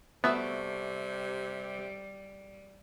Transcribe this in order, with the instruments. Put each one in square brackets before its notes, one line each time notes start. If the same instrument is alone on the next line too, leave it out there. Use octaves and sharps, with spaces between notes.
[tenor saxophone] C3 [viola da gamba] G3 [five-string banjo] A3 F#4 E5 [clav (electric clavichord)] B3